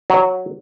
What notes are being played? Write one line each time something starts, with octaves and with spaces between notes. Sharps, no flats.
F#3